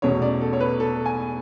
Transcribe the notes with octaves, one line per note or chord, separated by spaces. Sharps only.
E2 B2 A3 C#4 C#5
D5
A4
C#5
B4
A4
G#5